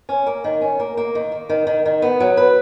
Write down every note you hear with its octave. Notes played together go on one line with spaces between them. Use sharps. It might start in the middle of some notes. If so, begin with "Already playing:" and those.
C#4
A#3
D#3
C#4
A#3
A#3
D#3
A#3
D#3
D#3
D#3
B3
F#3
B4